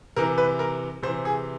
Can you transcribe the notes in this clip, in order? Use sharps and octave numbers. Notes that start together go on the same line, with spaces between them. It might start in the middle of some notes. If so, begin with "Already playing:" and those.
C3 E3 A#4
B4
A#4
C3 E3 C5
G#4